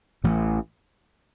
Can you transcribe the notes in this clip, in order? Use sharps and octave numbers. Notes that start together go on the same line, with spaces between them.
A1 A2 E3 A3